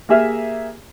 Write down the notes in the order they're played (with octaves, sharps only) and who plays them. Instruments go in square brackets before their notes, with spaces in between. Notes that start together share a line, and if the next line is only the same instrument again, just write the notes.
[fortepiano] A#3 G4 G#4 E5 F6